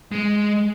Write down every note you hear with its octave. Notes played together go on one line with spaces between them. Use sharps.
G#3